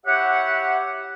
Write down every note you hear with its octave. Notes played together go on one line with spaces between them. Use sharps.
E4 G4 C#5 E5 F#5